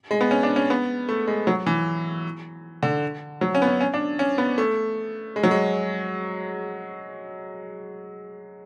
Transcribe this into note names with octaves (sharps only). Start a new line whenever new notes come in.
G#3
B3
C#4
D4
C#4
B3
A3
G#3
F#3
E3
D3
F#3
C#4
B3
C#4
C#4
D4
C#4
B3
A3
G#3
F#3
G#3